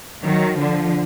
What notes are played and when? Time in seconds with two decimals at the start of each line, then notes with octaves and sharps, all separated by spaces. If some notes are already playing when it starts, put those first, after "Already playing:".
0.23 D#3 F#3
0.58 D3 F3